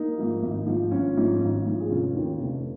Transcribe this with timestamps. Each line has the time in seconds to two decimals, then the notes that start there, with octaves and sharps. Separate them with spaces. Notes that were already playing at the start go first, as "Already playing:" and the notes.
Already playing: A#3 D#4
0.18 G#2 F3
0.43 G#1
0.66 G#2 F3
0.91 G#1 C#4 F4
1.16 G#2 F3
1.41 G#1
1.66 G#2 F3
1.80 G#4
1.90 F1 C#4 F4
2.14 D#2 D#3
2.39 F1